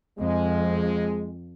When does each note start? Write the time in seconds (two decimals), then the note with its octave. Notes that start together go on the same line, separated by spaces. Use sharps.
0.18 F2 G#3